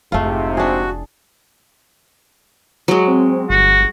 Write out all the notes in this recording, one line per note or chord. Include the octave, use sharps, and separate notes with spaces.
F1 G#2 C3 A3 E4 F4
D4 F#4 G#4
F#3 G#3
C4
G1 F#4